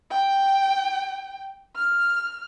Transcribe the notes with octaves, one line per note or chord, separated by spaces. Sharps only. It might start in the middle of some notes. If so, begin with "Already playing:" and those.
G5
F6